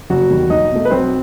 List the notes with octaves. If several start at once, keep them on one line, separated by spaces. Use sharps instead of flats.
F#1 F#4 F#5
E2 D#3 G3
B1 D#4 D#5
B2 A3
B4
B1 C4 C5